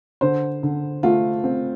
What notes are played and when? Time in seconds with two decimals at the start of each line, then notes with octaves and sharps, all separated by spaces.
0.21 D3 C5
0.63 D3
1.03 A3 F4
1.44 C4